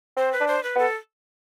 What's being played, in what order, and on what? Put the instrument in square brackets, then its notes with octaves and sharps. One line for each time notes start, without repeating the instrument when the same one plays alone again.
[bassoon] C4 [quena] C5
[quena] B4
[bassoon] D4
[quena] C5
B4
[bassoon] B3 [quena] A4